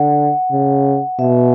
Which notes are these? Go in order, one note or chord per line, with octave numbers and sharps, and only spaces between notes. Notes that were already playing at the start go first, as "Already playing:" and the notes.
Already playing: D3 F#5
C#3
B2 E5